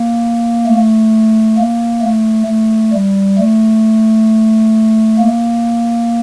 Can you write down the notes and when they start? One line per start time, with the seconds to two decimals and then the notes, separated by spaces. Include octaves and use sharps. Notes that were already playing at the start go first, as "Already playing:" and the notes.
Already playing: A#3
0.67 A3
1.58 A#3
2.02 A3
2.47 A3
2.93 G3
3.39 A3
5.19 A#3